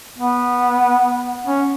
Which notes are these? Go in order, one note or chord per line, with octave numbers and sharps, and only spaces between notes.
B3
C#4